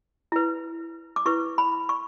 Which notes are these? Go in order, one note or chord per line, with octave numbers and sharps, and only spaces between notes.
E4 B4
D6
E4 B4 C#6
B5
C#6